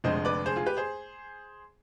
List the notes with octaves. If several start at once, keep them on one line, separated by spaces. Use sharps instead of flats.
F1 F2 D3 G#3 C5 D#5
B4 D5
G#4 C5
F4 G#4
G4 B4
G#4 C5